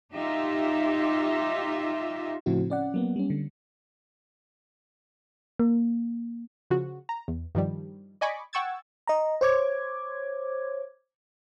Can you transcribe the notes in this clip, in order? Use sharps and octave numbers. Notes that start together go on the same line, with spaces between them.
D#4 F4 G4 E5
A2 C#3 F3 C4 E4 F#4
C#4 D5 F#5
F#3 A#3 B3
G3 C#4
D3
A#3
C#3 F3 F#4
A#5
E2
G2 D#3 F3 G3
D5 D#5 G#5 B5 C#6 D6
F#5 G5 C#6 E6 G#6 A6
D#5 A#5
C5 C#5 D6 G#6